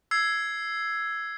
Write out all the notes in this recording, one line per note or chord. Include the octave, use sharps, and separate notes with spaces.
E6 G#6 C7